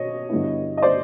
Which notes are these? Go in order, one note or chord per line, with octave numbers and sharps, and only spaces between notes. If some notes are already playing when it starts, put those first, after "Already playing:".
Already playing: B2 C#5 D#5
G2 D3 G3 B3 E4
D#5
C5 D5